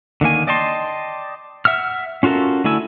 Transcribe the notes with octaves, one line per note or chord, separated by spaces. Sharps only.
D3 D#3 A#3 G#5
D5 D#5 G5 A5 C6
E5 F#5 E6 F6
C#4 F4 F#4 A4 A#4
D3 A3 E4 G#5 E6